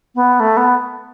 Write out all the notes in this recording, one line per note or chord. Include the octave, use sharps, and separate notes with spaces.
B3
A3
B3